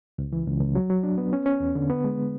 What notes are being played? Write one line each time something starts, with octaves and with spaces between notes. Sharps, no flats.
C#2
E3
C#2
C#2
F#3
F#3
D4
B3
C#4
C#4
E2
D3
B3
G#3